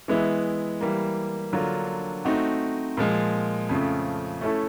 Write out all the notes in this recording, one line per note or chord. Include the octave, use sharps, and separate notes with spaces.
E3 G#3 B3 E4
E3 G3 A#3
D3 F#3 A#3 D4 F4
A3 C4 D#4 F#4
A#2 F3 G#3
F2 C#3 F3 A3
A3 C#4 E4 A4